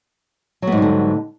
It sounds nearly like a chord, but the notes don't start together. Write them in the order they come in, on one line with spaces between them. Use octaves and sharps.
F#3 B3 G#2 G3 D3